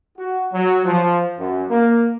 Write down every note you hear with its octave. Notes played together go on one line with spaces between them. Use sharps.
F#4
F#3
F3
F#2
A#3